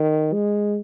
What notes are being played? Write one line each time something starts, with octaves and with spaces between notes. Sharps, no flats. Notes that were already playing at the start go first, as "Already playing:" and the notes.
Already playing: D#3
G#3